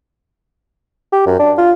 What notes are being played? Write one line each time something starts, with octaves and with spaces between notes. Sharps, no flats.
G4
F#2
D4
F4